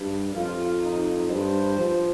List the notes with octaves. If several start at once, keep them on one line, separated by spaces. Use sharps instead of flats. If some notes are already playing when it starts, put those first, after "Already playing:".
Already playing: G2
F2 F4
D#4
G2 C5
F3